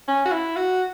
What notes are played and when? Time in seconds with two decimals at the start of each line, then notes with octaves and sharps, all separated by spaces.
0.08 C#4
0.25 F#4
0.31 E4
0.56 F#4